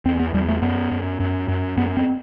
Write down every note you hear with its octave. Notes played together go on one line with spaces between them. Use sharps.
E2 C4
B3
E2 G3
A3
F#2 B3
F#2
F#2
F#2
F#2 B3
C4